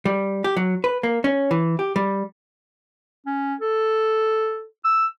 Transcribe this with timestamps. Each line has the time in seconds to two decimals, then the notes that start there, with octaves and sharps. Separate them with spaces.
0.05 G3
0.44 G4
0.57 F#3
0.84 B4
1.03 A#3
1.24 C#4
1.51 E3
1.79 G4
1.96 G3
3.26 C#4
3.61 A4
4.84 E6